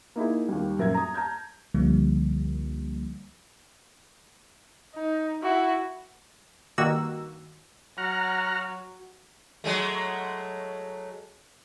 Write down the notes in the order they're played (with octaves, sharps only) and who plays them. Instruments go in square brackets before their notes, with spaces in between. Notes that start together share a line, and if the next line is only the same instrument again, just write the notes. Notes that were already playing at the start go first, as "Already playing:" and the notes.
[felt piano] A#3 D#4 E4 G#4
D#2 G3
D#1 F#2 A#4 E5 G#6
A#5 D#6
A5 A#5 F6 G6 G#6
[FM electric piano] C#2 D3 F3 G3 A#3
[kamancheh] D#4
E4 F#4
[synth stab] G2 D#3 A#3 F#4 E6
[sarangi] F#3 [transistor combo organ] F#5 A#5 F6
[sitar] F#3 G#3 A3